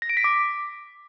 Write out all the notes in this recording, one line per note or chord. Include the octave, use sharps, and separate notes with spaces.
A#6
D7
B6
D6